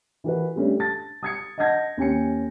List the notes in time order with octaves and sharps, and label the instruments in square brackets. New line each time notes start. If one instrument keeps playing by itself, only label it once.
[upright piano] E3 F#4 A#4 B4
G3 A3 C#4 D4
A5 A6
D#6 G#6 C#7
D#5 F#5 A5 G6 G#6 A#6
D#2 C#4 G#5 C#7